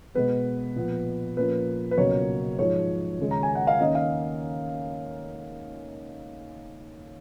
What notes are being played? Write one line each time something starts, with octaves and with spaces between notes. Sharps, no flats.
B2 G#3 B3 B4
A#2 F3 B3
A#2 F3 A#3 C#4 B4
B4
C#2 B2 F#3 A#3 C#4 C#5
G#2 F3 G#3 C#5
D#2 C#3 G#3
A#5
G#5
F#5
F5
D#2 D#3 A#3 C#4 D#5
F5